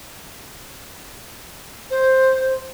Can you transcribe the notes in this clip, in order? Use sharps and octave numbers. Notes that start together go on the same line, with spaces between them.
C5